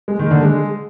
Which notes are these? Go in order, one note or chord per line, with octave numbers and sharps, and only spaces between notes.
G#3
D#3
D3
G#3